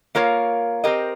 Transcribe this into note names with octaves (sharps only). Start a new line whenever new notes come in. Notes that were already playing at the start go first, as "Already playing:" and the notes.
A#3 F4 A#4 C#5 F5
C4 G4 A#4 D#5